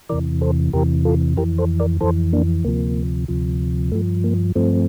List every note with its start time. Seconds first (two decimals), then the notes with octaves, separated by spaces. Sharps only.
0.09 E2 C3 E3 A#4 D5
0.41 A4 C5
0.73 E2 C3 E3 G4 A#4
1.05 F4 A4
1.37 F2 E3 G4 A#4
1.58 A4 C5
1.80 A#4 D5
2.01 F2 E3 A4 C5
2.33 A#3 D4
2.65 D2 C3 F3 A#3
3.28 D2 C3 F3
3.92 G2 F3 A3
4.24 A#3
4.55 G2 F3 A3 C4